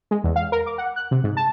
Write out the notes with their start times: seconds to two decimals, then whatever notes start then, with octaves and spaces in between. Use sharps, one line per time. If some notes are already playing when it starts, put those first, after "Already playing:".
0.11 G#3
0.24 E2
0.36 F5
0.52 A#4
0.66 D6
0.78 F#5
0.96 F#6
1.11 C3
1.24 G#2
1.37 A5